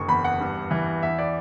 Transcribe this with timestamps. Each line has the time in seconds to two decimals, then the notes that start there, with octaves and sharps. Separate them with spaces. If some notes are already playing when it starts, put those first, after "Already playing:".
Already playing: F#1 D3 C#6
0.08 E2 B5
0.24 F#5
0.40 G2
0.71 E3
1.03 E2 E5
1.19 D5